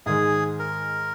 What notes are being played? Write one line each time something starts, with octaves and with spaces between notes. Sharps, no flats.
G#2 D#3 G#3 G#4
A#4